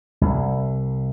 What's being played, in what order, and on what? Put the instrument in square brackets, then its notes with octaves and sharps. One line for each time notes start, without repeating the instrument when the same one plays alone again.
[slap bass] C2